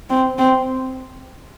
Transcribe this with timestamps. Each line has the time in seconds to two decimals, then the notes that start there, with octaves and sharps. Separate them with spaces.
0.10 C4
0.38 C4